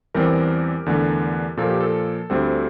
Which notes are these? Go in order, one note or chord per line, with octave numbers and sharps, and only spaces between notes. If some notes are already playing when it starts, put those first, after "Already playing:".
E2 E3 G3 C4 G4 A#4
E2 D3 A3
A#2 F3 A#3 A4
G4
A4
D2 D3 G3 C4